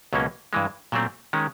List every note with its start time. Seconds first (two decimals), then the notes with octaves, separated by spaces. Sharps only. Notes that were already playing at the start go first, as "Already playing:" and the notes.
0.13 C#2 B2 F#3 A#3 C#4
0.53 G2 E3 G#3
0.92 A#2 F#3 A3 C4
1.33 D#3 G#3 C#4